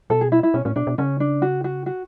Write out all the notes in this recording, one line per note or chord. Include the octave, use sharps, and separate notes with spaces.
B2 A4
G#4
E4
E4
B2 C#4
A2 C#4
B2 D4
B2
C#3 C#4
D4
F#4
F#4
F#4